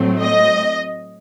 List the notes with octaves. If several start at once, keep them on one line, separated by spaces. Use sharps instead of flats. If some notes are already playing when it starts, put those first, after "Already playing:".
Already playing: A2 F#3 A3 C4
D#5